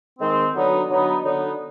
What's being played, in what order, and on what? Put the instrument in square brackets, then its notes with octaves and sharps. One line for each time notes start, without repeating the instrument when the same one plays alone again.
[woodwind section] D#3 G#3 C4
D3 F#3 B3 D#4
D3 F#3 B3 D#4
D3 F#3 B3 D#4